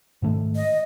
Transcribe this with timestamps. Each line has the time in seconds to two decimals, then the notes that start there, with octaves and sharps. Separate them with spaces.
0.22 G#2 D#3 A3
0.56 D#5